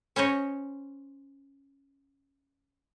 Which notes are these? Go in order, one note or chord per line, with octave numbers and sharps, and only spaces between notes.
C#4 C5 C#5 D#5